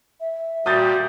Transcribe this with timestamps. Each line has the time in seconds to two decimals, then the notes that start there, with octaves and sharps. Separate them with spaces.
0.20 E5
0.66 A#2 G3 F#4 D#6 G6 A6